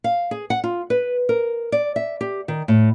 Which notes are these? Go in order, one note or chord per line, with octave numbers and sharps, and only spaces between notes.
F5
G#4
F#5
F4
B4
A#4
D5
E5
G4
D#3
A2